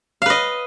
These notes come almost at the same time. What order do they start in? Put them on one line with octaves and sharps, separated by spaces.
F5 B4 D#5